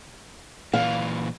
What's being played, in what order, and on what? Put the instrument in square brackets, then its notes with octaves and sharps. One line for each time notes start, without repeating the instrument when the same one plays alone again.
[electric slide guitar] A#2 E3 [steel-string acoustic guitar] F5